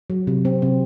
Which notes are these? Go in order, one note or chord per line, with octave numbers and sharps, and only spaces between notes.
F#3
C3
C4
C3